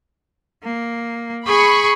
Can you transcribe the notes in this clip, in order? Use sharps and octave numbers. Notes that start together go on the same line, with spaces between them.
A#3
G#4 B5 C#6